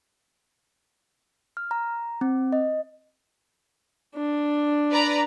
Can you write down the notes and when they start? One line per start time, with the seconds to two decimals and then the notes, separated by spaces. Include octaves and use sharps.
1.57 F6
1.71 A#5
2.21 C4
2.53 D#5
4.15 D4
4.91 B4 D5 A#5